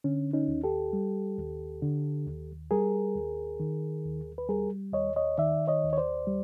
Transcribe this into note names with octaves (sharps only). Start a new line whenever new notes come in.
D3 C#4
C#4 D#4
D#2
G4 A4
G3
D#2
D3
D#2
G3 G#4 A#4
D#2
D#3
D#2
B4
G3 G#4 A#4
D#2 C#5 D#5
C#5 D#5
D#3 D5 E5
C#5 D#5
D#2
C#5
C5 D5
G3